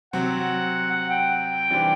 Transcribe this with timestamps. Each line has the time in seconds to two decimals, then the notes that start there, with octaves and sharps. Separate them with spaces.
0.13 C3 F#3 C4 F#5
0.91 F#5
1.11 G5
1.70 E3 G3 D4 G4 C5